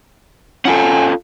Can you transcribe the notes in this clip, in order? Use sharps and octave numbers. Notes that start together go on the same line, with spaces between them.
C#4 F4 A4 F#5 G#5